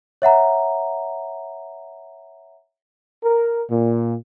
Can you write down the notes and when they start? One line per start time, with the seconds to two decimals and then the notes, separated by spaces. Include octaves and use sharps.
0.22 C#5 E5 F#5 A#5
3.23 A#4
3.70 A#2